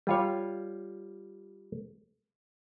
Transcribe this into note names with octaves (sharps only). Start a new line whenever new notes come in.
G3 F4 C#5